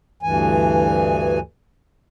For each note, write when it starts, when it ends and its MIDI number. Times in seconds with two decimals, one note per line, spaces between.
0.23 1.39 38
0.23 1.39 43
0.23 1.39 52
0.23 1.39 80